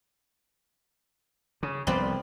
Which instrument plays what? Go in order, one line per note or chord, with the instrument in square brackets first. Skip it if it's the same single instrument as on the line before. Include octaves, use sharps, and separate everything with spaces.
[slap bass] C#3
[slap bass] C2 F3 B3 [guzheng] C4 B4 D5